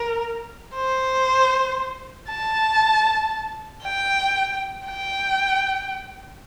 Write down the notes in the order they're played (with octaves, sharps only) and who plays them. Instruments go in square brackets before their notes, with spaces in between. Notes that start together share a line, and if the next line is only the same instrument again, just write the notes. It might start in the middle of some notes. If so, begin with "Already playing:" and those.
Already playing: [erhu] A#4
C5
A5
G5
G5